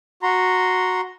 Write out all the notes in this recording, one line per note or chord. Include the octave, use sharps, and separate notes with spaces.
F#4 A#5 C6